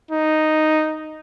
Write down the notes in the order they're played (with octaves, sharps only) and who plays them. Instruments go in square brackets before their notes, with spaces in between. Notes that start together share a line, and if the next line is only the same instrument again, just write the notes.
[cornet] D#4